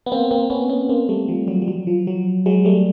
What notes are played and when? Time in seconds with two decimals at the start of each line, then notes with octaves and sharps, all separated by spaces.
0.06 B3
0.12 A#3 C4
0.31 A#3 C4
0.50 B3 C#4
0.69 B3 C#4
0.89 A#3 C4
1.09 G3 A3
1.28 F3 G3
1.48 F#3
1.62 G3
1.68 F#3
1.87 F3
2.07 F#3
2.46 F#3 G#3
2.65 G3 A3